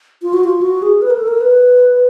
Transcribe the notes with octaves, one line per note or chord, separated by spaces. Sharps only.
F4
F#4
F4
F#4
G#4
B4
A#4
A4
A#4
B4